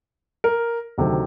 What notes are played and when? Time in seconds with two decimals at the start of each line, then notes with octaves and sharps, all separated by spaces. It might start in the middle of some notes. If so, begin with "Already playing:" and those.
0.44 A#4
0.98 D2 C3 D#3 F#3 A3